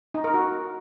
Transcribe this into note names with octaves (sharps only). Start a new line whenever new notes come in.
D#4
A#4
F#4